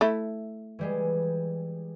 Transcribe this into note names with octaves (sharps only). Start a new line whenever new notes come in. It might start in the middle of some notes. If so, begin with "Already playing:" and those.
A3 E4
E3 G3 G#3